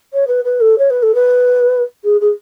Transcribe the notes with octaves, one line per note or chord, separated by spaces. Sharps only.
C#5
B4
B4
A4
C#5
B4
A4
B4
G#4
G#4